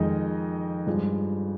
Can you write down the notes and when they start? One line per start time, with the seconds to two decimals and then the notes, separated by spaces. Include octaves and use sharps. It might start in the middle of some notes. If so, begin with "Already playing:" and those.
Already playing: F2 D#3 G#3 D#4 D#5
0.87 G2 F3 G#3